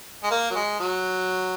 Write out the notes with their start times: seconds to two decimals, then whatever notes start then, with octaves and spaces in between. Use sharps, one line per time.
0.23 G#3
0.31 A#3
0.51 F#3
0.55 G#3
0.80 F#3